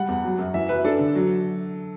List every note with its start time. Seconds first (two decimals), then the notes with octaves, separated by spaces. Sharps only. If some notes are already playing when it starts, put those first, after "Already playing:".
Already playing: G3 F#5
0.08 E2
0.24 F#3
0.38 F#2
0.54 E3 E5
0.69 F#2 B4
0.84 D4 A4
0.99 D3
1.15 F#3